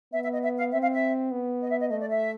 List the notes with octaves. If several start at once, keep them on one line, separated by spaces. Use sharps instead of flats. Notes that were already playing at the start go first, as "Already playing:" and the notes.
B3 E5
E5
D#5
E5
F5
C4 E5
F5
E5
B3
D#5
E5
D#5
A3 D#5
D5
E5